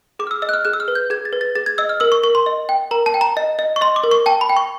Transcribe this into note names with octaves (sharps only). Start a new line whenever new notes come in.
G#4 D6
F6
E6
D#5 E6
F#6
F6
G#4 F#6
E6
F6
B4
G6
G#4 G#6
A6
B4
A6
G#4 A6
G#6
D#5 E6
F6
A#4 E6
C#6
A#4 C#6
C6
D#5
G5
A#4 A#5
A5
G5
A#5
D#5
D#5
C#6
D#5 C6
D6
A#4
C#6
G5 A5
B5
G5
C#6